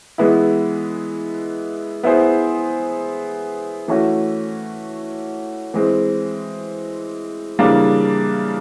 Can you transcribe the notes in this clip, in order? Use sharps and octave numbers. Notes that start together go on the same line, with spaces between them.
E3 G#3 B3 E4
B3 E4 G#4 C5
E3 A3 C#4 F#4
E3 G#3 C4
C#3 E3 G3 A#3 D4